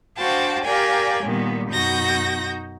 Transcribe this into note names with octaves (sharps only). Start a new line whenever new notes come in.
D4 F#4 C5 F5 G5 A5
G4 A#4 D5 F5 G5 G#5
A#2 D#3 G3 B3
F#2 B2 D#4 F#4 G6 A#6